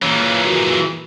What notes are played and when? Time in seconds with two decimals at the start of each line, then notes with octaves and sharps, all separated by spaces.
0.02 A#2 C#3 E3 A#3
0.44 G#3 A#3 F#4